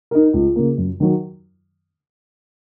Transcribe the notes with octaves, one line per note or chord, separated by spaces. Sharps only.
D#4 A#4
C#2
C#3 A#3
F#2
D#3 F#3